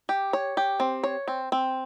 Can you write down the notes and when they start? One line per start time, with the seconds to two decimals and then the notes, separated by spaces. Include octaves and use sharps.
0.09 G4
0.33 C#5
0.57 G4
0.80 C4
1.04 C#5
1.28 C4
1.52 C4